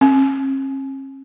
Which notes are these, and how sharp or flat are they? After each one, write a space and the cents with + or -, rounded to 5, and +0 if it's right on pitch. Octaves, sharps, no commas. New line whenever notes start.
C#4 -45